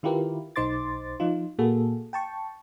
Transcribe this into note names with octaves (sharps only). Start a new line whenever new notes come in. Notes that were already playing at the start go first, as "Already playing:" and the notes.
D#3 E4 F4 G4 A#4 B4
B1 D#4 C5 C6 D6 A6
F3 D#4 F4
A#2 A#3 F#4 G#4 A4
G5 A5 C#6